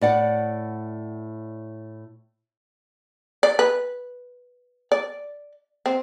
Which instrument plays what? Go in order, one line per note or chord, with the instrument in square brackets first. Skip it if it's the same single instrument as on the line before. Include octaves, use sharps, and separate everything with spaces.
[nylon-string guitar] A2 D5 F#5
[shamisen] D5
B4
D5
C4